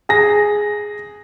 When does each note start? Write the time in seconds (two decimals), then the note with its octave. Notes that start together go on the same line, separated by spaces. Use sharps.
0.09 G#4 A#6